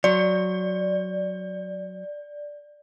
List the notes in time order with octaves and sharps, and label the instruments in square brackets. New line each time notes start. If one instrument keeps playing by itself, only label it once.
[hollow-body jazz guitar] F#3 [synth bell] D5